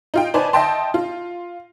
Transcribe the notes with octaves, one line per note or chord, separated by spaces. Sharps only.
D#4 F4 G5
D#4 B4 C5 D5 G#5 A5
D#5 E5 G5 A5 C6
F4